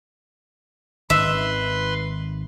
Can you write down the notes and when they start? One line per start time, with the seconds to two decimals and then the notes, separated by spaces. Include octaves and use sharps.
1.10 G#1 D#3 B4 E5 C6